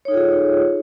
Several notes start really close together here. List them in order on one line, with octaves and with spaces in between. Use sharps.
C#5 D#4 A4 F4 G#4